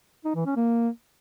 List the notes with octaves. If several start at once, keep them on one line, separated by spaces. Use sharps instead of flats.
D#4
E3
C#4
A#3